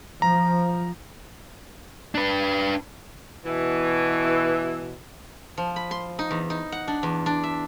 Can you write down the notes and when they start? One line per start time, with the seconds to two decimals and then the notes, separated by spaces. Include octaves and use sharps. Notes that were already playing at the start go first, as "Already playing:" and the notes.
0.22 F3 A#5
2.15 D4 B4
3.45 B2 E3
5.58 F3
5.76 B5
5.91 C6
6.19 D#4
6.31 E2
6.50 D#4
6.72 F#5
6.88 D4
7.03 E2
7.26 D4
7.43 E5